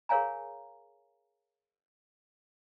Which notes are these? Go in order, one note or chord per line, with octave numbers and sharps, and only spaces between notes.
G#4 A#4 C#5 F5 G#5 A#5